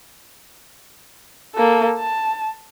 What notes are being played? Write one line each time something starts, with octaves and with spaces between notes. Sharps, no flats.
A#3 A4
A5